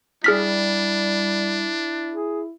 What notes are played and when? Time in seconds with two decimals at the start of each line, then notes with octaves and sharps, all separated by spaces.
0.24 G3 D4 E4 G#4 F6 B6
2.12 G#4